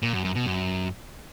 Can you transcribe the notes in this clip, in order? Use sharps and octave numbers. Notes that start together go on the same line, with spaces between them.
A#2
F#2
F#2
B2
F#2